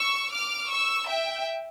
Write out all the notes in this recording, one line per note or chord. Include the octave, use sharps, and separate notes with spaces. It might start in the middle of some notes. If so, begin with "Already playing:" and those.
Already playing: C#6 E6
D6 F6
C#6 E6
E5 G5